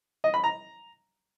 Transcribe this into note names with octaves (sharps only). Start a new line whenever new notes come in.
D#5
B5
A#5